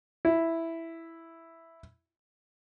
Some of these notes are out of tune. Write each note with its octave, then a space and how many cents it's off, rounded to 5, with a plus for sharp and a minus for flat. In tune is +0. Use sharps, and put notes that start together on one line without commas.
E4 +0